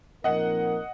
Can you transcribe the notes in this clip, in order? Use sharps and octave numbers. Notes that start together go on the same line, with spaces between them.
A#2 F3 C4 D#4 A#4 D#5 F#5